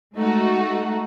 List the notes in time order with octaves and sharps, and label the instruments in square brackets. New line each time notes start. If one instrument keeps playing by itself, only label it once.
[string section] G#3 A3 D#4 F#4